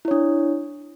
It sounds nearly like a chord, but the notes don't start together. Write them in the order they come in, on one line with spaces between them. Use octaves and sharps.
E4 C#5 D4